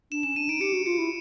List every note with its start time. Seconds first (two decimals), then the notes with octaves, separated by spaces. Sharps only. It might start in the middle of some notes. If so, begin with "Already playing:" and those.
0.11 D4 E7
0.23 C#4 E7
0.36 D4 D#7
0.49 D#4 D7
0.61 G4 C#7
0.73 F#4
0.86 F4 C#7
0.98 E4